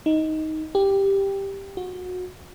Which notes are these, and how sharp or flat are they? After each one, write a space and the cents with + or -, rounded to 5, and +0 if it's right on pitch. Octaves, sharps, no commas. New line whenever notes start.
D#4 +10
G4 +5
F#4 -25